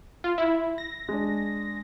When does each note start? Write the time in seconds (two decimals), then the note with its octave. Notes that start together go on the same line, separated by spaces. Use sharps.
0.24 F4
0.38 E4
0.78 A#6
1.08 G#3 D4